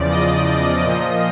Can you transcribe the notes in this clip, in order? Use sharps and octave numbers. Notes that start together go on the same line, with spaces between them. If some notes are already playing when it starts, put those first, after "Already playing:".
Already playing: E2 C#3 F3 D5
D#5
A#2 F3